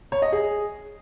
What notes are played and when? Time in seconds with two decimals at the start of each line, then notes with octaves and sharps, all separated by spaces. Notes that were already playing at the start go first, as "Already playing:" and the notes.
0.12 C#5
0.22 D#5
0.32 G#4